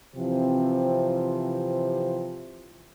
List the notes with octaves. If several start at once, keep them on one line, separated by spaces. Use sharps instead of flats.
C3 E3 F3 C4